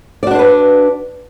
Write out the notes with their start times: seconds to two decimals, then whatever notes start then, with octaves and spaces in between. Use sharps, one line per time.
0.23 D5
0.27 F#4
0.31 D4
0.35 C5
0.39 B4